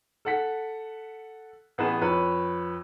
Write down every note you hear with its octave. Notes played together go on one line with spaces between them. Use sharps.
A4 F#5 B6
A1 B3 G#4 B4 E7
F2 B4 C#5